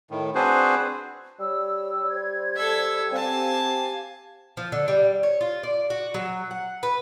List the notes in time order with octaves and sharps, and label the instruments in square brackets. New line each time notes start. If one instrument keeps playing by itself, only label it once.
[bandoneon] A2 D#3
C4 D4 F#4 G#4 B4 C5
[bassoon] G3 [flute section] C#5 E6
[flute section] C5 G#6
[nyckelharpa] A4 E5
[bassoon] C4 [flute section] G4 F5 [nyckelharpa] G#5 A5
[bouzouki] F3
D3
G3
C#5
F4
D5
F#4
F#3
F#5
B4